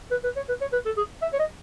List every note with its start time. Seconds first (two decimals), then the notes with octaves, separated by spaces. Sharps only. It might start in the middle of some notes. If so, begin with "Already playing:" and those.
0.11 B4
0.24 B4
0.36 C#5
0.49 B4
0.61 C#5
0.73 B4
0.86 A4
0.97 G#4
1.22 E5
1.33 C#5
1.39 D#5